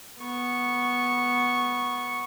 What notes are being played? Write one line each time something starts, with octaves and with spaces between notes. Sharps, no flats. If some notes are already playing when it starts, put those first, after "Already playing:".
B3 C#6